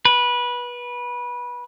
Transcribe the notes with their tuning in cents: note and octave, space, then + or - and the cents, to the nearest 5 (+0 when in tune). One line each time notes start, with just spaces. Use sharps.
B4 -20